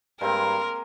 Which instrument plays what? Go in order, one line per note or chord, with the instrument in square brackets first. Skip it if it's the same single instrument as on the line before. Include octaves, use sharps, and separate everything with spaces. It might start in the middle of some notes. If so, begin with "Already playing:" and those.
[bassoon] G2 [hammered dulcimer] G#3 A#3 C4 [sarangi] A#4